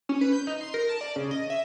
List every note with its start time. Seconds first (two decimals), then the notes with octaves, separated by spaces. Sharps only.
0.09 C#4
0.21 B4
0.33 G6
0.47 D#4
0.61 C6
0.74 A#4
0.89 A5
1.01 D5
1.16 C#3
1.31 D#5
1.50 E5